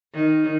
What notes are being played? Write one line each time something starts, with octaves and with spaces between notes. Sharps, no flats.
D#3